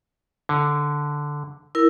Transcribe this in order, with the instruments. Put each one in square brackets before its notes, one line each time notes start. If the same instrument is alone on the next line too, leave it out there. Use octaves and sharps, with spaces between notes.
[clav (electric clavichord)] D3
[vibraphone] E4 A#4